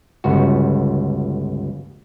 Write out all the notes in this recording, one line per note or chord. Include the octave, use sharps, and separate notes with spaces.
G1 C#2 F#4